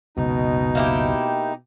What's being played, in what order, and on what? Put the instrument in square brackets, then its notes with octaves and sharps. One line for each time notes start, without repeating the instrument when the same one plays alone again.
[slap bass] F#1 C#2 [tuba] B2 [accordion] D#4
[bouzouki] A#3 E4 G4